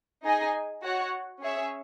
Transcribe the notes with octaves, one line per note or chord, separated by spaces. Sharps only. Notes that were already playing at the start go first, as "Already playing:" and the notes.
D#4 G#4 D#5 G#5
F#4 C#5 F#5
C#4 G#4 C#5 E5